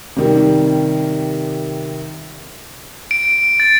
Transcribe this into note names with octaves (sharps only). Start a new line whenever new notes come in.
C3 D#3 G3
D7
A6